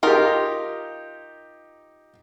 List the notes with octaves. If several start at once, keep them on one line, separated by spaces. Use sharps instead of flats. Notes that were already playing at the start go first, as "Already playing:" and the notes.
D#4 F4 G4 A#4